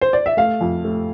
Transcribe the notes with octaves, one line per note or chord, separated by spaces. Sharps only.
C5
D5
E5
A3 F5
F2
A3